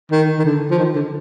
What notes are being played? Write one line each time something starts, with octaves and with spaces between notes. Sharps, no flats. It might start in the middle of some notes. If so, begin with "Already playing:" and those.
D#3
D#3
D3
F3
D#3
D3